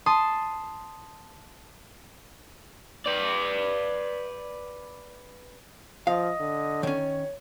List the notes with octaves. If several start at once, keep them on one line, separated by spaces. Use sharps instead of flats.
A5 C6 D#6
B4 D5
F3 D#5 F5
D3
D#3 C#4 C#5